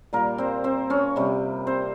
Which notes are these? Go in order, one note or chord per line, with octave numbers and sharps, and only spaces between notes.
A#2 G3 A#3 A#4
C4 C5
C4 C5
C#4 C#5
C3 G3
C4 C5